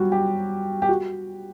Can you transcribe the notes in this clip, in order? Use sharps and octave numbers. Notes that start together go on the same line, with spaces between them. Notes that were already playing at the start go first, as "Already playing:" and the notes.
Already playing: F#3 G3 F#4
G4
G4
F#4